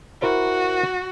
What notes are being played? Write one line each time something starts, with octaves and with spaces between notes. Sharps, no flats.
E4 F#4 A#4 C5